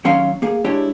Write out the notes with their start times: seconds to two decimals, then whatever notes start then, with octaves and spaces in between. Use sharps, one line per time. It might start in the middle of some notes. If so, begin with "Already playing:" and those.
0.05 D#2 F#3 C#4 C#5 F5 C6
0.42 A#3 G#4
0.65 G#3 D4 E4 G4 C#5